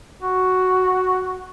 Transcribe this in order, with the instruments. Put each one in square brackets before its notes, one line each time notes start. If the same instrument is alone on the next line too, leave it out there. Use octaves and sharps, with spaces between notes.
[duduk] F#4